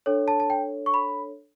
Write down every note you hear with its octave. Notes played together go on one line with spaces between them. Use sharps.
D4 A4 C#5
A5
A5
G5
C#6
B5